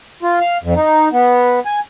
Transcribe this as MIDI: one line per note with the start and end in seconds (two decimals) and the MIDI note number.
0.23 0.39 65
0.41 0.57 77
0.64 0.74 41
0.76 1.09 63
1.12 1.60 59
1.65 1.80 80